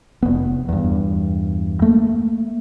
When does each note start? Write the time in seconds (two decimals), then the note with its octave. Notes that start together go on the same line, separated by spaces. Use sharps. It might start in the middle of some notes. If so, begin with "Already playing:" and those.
0.23 F1 B3
0.69 E2 G2
1.82 A3 A#3